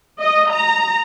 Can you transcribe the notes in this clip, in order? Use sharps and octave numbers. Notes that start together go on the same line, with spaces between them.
D#5
A#5